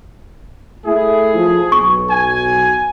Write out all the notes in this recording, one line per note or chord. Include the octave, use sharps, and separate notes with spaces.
A3 E4 G#4
F3
B1 C#6
G#5